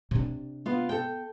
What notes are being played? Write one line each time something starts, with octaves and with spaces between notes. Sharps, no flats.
C3 D4
B3 F4
A4 G5